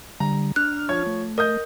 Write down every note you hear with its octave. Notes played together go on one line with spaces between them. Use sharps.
D3 G3 A#5
D4 F6 F#6
F3 C#5 G#6
A3
A#4 D#5 D#6 G6